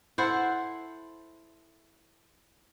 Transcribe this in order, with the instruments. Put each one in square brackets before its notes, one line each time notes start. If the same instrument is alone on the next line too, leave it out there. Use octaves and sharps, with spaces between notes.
[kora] E4 A4 C5 F#5